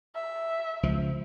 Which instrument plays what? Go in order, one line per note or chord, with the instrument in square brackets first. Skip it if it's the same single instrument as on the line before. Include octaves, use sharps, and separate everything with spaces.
[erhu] E5
[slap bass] C#2 F3